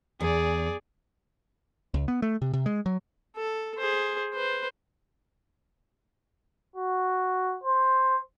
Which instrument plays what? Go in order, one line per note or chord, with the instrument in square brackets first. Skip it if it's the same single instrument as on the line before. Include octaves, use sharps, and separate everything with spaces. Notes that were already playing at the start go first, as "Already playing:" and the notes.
[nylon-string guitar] E2 [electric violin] G#4 D5
[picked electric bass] C#2
B3
A3
C3
C3
G#3
F#3
[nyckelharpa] A4
G#4 C5
B4 C5
[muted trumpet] F#4
C5